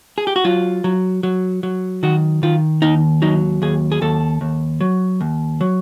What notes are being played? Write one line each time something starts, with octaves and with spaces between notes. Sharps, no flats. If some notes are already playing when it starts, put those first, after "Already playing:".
G#4
G4
F#4
F#3 F4
F#3
F#3
F#3
D#3 F#4
D#3 F4
D#2 D#4
F#3 D#4
D#2 G#4
G#4
D#2 A4
D#2
F#3
D#2
F#3